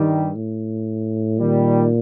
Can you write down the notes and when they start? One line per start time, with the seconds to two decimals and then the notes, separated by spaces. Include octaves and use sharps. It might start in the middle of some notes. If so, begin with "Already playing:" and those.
Already playing: G2 D#3 G3
0.35 A2
1.39 A#2 D#3 G3